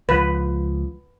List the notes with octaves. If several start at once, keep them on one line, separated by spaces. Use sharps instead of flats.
C#2 F3 B4